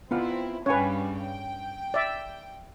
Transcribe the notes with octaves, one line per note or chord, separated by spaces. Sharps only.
B3 C4 E4 F4 F#5
G2 C#3 G3 C#4 B4 C#5 F5 G#5
G5
D5 E5